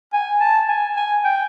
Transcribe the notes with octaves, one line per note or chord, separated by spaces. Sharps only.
G#5
A5
G#5
G#5
G5